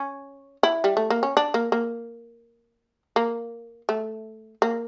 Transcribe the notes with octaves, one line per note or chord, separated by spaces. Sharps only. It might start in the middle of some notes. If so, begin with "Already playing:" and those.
Already playing: C#4
E4
G3
A3
A#3
C#4
D4
A#3
A#3
A#3
A3
A#3